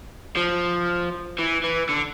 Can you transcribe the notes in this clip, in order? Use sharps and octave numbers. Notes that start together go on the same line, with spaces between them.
F3
E3
E3
D3